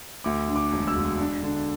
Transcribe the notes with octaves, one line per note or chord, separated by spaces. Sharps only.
D2 D6
D3
D6
E1
E6
E1
D4
D3